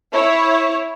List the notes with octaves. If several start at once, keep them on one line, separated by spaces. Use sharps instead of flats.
E4 C#5